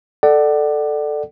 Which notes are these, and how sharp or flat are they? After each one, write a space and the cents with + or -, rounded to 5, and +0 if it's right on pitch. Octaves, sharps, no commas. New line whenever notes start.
A4 +0 D5 +20 F#5 +25